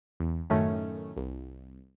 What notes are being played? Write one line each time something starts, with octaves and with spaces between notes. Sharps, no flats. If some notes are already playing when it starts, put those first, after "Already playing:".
E2
F#2 A2 D#3 A3 C#4
C2